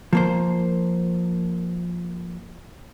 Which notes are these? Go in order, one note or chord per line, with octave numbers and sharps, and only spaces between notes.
F3 A#3 C5